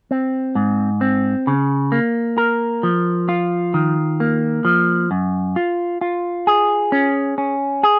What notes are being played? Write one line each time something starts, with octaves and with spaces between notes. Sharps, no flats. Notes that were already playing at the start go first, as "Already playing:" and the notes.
C4
G#2
C4
C#3
A#3
A#4
F3
F4
D#3
A#3
F3
F#2
F4
F4
G#4
C#4
C#4
G#4